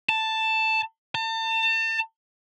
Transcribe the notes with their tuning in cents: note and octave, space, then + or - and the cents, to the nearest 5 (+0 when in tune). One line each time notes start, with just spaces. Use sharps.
A5 +5
A5 +35